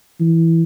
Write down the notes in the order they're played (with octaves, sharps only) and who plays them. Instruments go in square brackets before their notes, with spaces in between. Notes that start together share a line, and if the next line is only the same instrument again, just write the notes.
[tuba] E3